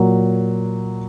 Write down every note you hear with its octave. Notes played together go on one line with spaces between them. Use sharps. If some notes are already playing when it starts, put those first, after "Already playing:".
Already playing: A#2 F#3